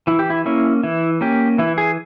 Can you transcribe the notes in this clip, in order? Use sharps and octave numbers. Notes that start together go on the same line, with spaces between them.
E3 E4
G4
E4
A#3 C#4 E4
E3 E4
A#3 C#4 G4
E3 E4
G#4